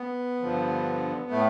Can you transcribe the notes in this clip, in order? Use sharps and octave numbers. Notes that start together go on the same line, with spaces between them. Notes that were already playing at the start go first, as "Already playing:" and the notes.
Already playing: B3
G2 D3 F3
A2 A3